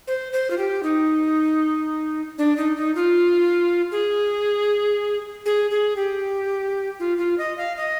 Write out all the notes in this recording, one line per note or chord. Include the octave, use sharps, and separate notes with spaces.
C5
C5
F4
G4
D#4
D4
D#4
D#4
F4
G#4
G#4
G#4
G4
F4
F4
D#5
F5
D#5